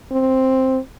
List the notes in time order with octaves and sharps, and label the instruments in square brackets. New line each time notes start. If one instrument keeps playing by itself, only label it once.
[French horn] C4